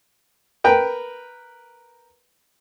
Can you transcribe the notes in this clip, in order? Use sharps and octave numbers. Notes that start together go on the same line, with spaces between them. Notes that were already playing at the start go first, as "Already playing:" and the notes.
A#4 B4 G5